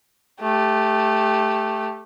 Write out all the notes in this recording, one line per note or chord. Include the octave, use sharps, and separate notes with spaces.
A3 G4